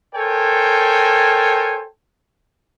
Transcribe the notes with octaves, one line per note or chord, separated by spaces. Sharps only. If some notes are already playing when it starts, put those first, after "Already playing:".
A4 A#4 C5 C#5 G5 G#5